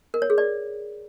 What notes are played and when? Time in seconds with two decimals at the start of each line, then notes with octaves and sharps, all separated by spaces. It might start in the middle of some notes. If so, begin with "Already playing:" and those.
0.14 A#4
0.22 C#5
0.30 G#4
0.38 D5